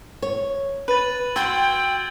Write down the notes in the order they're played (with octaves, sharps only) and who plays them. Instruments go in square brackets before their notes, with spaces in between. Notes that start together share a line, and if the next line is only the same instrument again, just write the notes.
[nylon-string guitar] C#5
[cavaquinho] B4 [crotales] A6 D#7 F#7
[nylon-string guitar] F#4 [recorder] G5 [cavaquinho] C6 [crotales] E6 G#6 A6